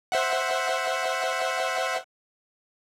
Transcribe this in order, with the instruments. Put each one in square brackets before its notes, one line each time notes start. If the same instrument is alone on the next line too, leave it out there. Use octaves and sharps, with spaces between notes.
[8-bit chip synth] C5 E5 F#5